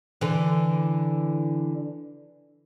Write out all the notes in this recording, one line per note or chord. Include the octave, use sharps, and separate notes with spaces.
D3 E3